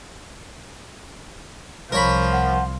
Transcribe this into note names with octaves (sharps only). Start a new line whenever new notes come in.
C2 F3 A#4 C#5 B5
F#5